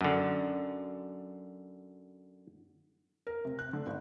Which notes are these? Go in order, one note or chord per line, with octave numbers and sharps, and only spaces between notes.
F#2 D3
A#4
C3
F#6
D3
G#1